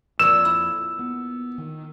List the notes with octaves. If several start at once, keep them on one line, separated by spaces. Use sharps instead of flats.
F2 A#2 C#5 E6 E7
E4
B3
D#3